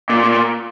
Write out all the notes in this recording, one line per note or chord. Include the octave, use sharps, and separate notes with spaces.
A#2
A#2